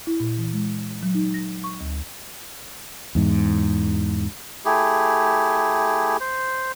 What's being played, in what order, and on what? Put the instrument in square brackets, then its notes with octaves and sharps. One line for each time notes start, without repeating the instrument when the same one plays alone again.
[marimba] E4
A#2
E3
G#3
F#3
D#4
A#6
C#6
D2
[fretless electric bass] E2 G#2
[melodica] A3 E4 G4 G#4
C5